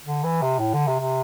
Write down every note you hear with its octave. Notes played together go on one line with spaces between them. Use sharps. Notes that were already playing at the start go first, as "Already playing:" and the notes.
D3
E3
C3
A2
D3
C3
C3